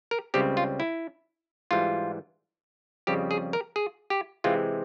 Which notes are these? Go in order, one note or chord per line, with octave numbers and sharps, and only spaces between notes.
A#4
C#2 C#3 G3 C4 G4
F4
E4
G#2 E3 G3 F4
F2 C#3 G3 C4 G4
G#4
A#4
G#4
G4
C3 E3 G#3 C4 F4